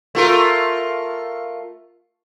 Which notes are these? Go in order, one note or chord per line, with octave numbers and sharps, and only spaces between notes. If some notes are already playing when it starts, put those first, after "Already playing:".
A3 F4 A#4